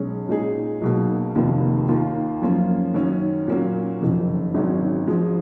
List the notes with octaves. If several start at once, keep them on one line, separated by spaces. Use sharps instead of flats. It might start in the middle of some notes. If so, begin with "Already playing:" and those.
Already playing: B1 G#3 C#4
A#2 G#3 D#4 G#4
B1 B2 A#3
F1 D#2 D#3 A#3 F4
D#2 D#3 A#3 F4
F#2 F3 A#3 C#4 F4
F#2 D#3 F#3 C#4
A#2 F#3 A#3 C#4 F#4
F#1 F2 D#3
G#1 G#2 D#3 F#3 C#4
G#2 F3 G#3